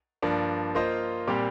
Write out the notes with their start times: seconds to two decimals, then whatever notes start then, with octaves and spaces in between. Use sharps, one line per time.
0.22 G2 F3 A#3 D4
0.75 A#3 F4 C5 D#5
1.27 A#2 G3 C4 G4